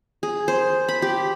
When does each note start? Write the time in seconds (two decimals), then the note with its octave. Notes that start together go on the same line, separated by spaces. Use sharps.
0.23 G#4
0.48 C5
0.89 B5
1.02 G4